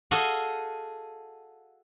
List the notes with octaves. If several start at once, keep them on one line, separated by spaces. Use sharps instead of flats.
F#4 G#4 A4 D#5 F5 F#5